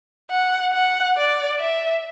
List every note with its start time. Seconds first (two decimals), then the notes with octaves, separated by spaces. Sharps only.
0.31 F#5
0.73 F#5
1.17 D5
1.60 E5